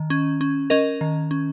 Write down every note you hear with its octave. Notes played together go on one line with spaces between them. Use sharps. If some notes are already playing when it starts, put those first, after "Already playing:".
Already playing: D#3
C#4
C#4
C#4 A#4 D#5
D#3
C#4